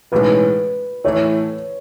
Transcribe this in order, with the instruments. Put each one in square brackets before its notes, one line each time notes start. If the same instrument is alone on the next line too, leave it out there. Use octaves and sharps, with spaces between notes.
[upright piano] B1 A2 E3 G#3 C#4 [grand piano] B4
[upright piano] A2 E3 A3 E4 [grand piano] C#5